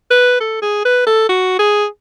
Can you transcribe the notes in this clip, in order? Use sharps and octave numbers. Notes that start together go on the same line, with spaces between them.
B4
A4
G#4
B4
A4
F#4
G#4